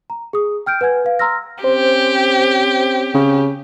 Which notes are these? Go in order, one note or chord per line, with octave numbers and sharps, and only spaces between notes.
A#5
G#4 D#6
G5 F6 G6 D7
B4 F#5 G#5 G#6
B4 F5
A#5 C6 E6 F6 A#6
C4 C#4 G4 C5
C#3